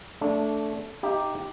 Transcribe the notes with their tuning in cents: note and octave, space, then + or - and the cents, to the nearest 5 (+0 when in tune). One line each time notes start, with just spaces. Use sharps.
A3 +0 D4 -20
D#4 +0 G4 +0 E5 +35